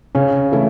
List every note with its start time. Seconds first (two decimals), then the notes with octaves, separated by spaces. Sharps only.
0.15 C#3 C#4
0.52 E3 A3 E4